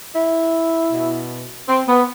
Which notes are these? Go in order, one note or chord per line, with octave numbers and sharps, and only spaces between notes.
E4
B2
C4
B3